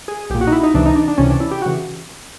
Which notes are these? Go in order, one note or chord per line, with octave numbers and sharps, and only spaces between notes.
G#4
B1 A#2 G4
F#4
D#4
E4
D#4
C#2 C3 E3 D4
D#4
D4
D4
C#2 C3 E3 C#4
D4
E4
G4
C#3 E3 F#4